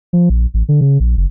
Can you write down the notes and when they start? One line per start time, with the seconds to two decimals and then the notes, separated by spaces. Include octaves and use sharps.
0.13 F3
0.29 A#1
0.54 A1
0.69 D3
0.81 C#3
1.00 A#1
1.17 F#1